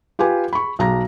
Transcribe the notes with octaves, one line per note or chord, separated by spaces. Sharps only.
F4 G4 B4 G#5
B5 C#6
B1 A#5 A#6